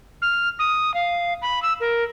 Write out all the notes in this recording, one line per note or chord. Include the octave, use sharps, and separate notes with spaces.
F6
D#6
F5
B5
E6
A#4